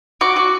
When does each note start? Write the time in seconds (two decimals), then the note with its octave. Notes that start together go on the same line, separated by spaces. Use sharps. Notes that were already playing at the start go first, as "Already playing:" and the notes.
0.21 F#4 D6
0.36 F#4